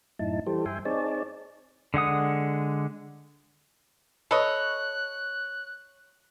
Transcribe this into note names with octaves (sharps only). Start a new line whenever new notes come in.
F#2 A2 D#4 E4 A5
E3 G3 G4 A4 C5
G2 E5 G5 G#5 C6
C4 D#4 G#4 C#5 D5 A5
D3 G#3 F#5 D#6
A4 B4 C#5 D#5 F#6